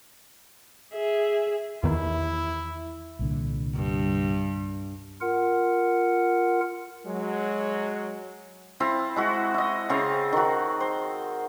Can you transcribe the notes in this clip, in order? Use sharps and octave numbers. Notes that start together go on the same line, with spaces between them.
G#4 E5
E2 D#3 E4
C2 A#2 D3
G2
F4 A#4 F#5
F#3 G#3
C4 E4 F5 A5
G#3 E4 F#4
E4 D#5
C#3 C4 F5 A5
D#3 F#4
C5